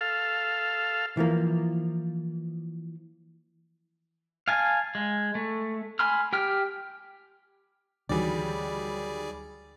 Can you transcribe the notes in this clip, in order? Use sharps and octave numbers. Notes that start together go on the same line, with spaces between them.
A4 F5
E3 F3 A#3
F5 G#5 A5
G#3
A3
G#5 B5 C6 F6
G4 G5 F6
D2 D#3 E3 F#3 G3 D4 G#4 D5